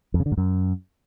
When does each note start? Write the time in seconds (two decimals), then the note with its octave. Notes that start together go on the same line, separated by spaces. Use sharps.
0.14 F2
0.20 C#3
0.26 D3
0.32 G#2
0.37 F#2